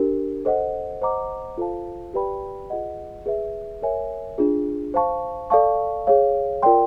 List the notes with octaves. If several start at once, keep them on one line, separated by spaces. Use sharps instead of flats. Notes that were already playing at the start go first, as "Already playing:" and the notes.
Already playing: D4 G4 A#4
A4 C5 D#5 F#5
C5 D#5 F#5 A#5 D6
F4 A4 C5 F5 A5
G4 B4 D5 G5 B5
F4 G#4 B4 D#5 F#5
G#4 B4 E5
A#4 C#5 E5 G#5
D4 F4 G#4
C5 F5 A5 C#6
A4 D5 F5 A5 C#6
G#4 C#5 F5
F4 A#4 D5 G5 C6